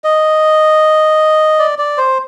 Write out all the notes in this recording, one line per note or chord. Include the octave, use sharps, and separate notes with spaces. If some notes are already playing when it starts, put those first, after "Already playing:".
D#5
D5
D5
C5